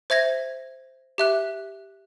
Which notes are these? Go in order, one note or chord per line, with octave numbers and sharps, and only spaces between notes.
C5 E5 G#6 A#6
G4 E5 F#6